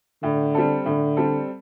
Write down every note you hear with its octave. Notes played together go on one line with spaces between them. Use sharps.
A2 D3
G3 C4 A4
A2 D3
G3 C4 A4